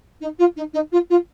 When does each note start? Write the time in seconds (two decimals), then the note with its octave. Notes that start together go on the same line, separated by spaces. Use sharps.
0.20 D#4
0.39 F4
0.56 D#4
0.73 D#4
0.92 F4
1.10 F4